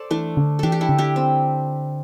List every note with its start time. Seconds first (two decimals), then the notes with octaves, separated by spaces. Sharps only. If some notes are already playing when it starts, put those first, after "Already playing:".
Already playing: A4 C5 D5
0.11 E3 A3 D4
0.37 D3
0.59 E3 D4 G4 A4
0.72 G4
0.81 E4 A4
0.89 D3
0.98 D4 G4
1.16 C4